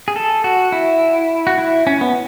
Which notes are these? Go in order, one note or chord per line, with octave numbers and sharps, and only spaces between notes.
G#4
A4
F#4
E4
F#4
E4
C#4
B3